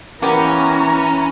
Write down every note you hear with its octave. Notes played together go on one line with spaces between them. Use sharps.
E3 A#3 B3 C#4 G4 A#5